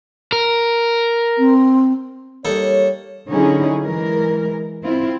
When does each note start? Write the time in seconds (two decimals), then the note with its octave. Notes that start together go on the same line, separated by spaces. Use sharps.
0.32 A#4
1.38 C4
2.45 G3 A#3 D#4 A4 C#5
3.29 D3 F#3 C#4 D#4 E4 G#4
3.83 E3 G#3 A#4
4.83 C4 E4 F4